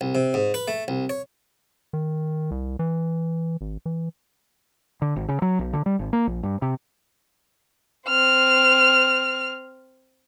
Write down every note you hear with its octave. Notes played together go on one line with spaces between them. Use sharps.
C2
C3
G#2
B4
A3
C2
C#5
D#3
C2
E3
G#1
E3
D3
G#1
C#3
F#3
B1
D3
G3
G#1
A#3
A#1
G2
C3
C4 F6